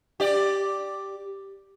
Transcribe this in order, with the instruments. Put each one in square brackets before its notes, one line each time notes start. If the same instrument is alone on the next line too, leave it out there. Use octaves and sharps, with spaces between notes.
[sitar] G4 D5